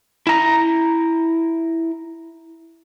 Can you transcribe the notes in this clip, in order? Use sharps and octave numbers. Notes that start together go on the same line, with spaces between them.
E4 A#5